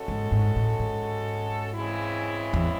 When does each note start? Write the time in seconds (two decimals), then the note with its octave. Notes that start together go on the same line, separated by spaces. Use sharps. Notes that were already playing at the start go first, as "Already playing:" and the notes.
Already playing: G#3 C#4 F#4 A4
0.08 G#2
0.32 G#2
0.56 A2
0.79 G#2
1.74 C#3 E3 G#3 C4 E4
2.53 E2